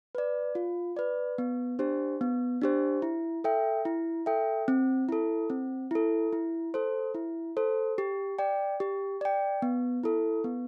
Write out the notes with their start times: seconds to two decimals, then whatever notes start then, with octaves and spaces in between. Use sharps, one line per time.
0.15 B4 D5
0.55 F4
0.96 B4 D5
1.38 B3
1.79 D4 G4 C5
2.21 B3
2.62 D4 G4 C5
3.02 E4
3.44 A4 E5 G5
3.85 E4
4.26 A4 E5 G5
4.68 C4
5.09 E4 A4
5.50 C4
5.91 E4 A4
6.33 E4
6.74 A4 C5
7.15 E4
7.57 A4 C5
7.98 G4
8.39 D5 G5
8.80 G4
9.21 D5 G5
9.62 B3
10.03 E4 A4
10.44 B3